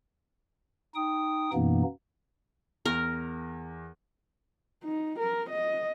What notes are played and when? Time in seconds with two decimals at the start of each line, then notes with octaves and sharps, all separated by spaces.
0.95 D#4 G5 D#6
1.53 F#2 B2 E3 A#3 B3 D#4
2.86 E2 A#4
4.84 D#4
5.19 A#4
5.50 D#5